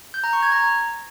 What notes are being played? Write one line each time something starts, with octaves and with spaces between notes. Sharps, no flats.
G6
A#5
C#6
G#6
A#5